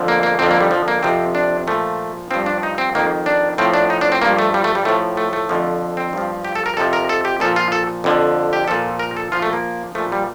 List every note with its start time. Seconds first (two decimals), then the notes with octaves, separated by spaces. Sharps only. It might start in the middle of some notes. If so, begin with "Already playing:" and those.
Already playing: F2 D3 F3
0.08 A#3
0.23 A#3
0.39 F2 D3 F3 C4
0.51 A#3
0.61 G3
0.71 F3
0.88 A#3
1.03 F2 C3 F3 C4
1.35 D4
1.67 A#2 F3 A3
2.31 G2 F3 C4
2.46 D4
2.63 D#4
2.78 C4
2.95 F2 D#3 A#3
3.26 D4
3.58 A2 F3 C4
3.74 D4
3.90 D#4
4.01 D4
4.12 C4
4.22 G2 F3 A#3
4.39 A3
4.54 G3
4.64 A3
4.75 G3
4.85 A2 F3 A3
5.17 A3
5.33 A3
5.49 F2 D3 F3
5.97 C4
6.13 G2 F3
6.45 G4
6.56 A4
6.66 A#4
6.77 F2 C3 F3 A4
6.93 A#4
7.09 A4
7.25 G4
7.40 A#2 F3 A4
7.56 F4
7.72 A4
8.04 F2 D3 F3
8.53 G4
8.68 A#2 F3 A4
8.99 A#4
9.17 A4
9.32 A#2 F3 F4
9.42 A3
9.53 A#3
9.95 A#2 F3 A3
10.12 G3